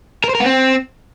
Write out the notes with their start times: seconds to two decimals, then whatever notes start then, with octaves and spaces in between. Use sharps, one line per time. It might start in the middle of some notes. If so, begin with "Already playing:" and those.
0.24 A#4
0.29 C5
0.35 A#4
0.40 B3
0.46 C4